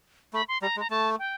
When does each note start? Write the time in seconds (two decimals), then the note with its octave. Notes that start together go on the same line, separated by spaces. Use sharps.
0.33 A3 B5
0.48 C6
0.62 G3 A#5
0.77 G#3
0.80 A#5
0.90 A3 A5
1.19 G5